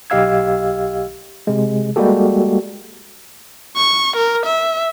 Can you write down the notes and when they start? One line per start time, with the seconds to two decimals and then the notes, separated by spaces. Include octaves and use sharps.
0.10 B1 G4 D#5 F5 E6 G#6
1.47 C3 G#3
1.96 G3 G#3 A#3 F#4 G4 A4
3.76 C#6
4.17 A#4
4.46 E5